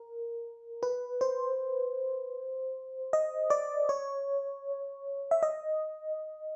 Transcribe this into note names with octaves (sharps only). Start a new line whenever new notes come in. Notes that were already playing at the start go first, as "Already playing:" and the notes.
Already playing: A#4
B4
C5
D#5
D5
C#5
E5
D#5